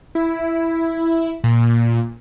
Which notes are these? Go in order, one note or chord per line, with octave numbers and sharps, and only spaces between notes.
E4
A#2